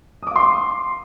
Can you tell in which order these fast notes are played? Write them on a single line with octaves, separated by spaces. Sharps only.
D#6 D6 F5 C6